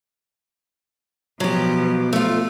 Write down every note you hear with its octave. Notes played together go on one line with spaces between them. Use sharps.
B2 F3 F#3 G4
A3 F4